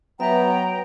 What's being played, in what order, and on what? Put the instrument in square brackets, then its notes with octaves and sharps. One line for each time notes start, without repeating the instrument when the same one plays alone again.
[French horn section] F#3 [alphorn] B3 [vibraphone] B4 E5 [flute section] G5 A#5